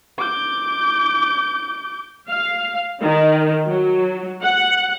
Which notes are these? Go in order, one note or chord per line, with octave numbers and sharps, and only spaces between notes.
D6 G6
F5
D#3
F#3
F#5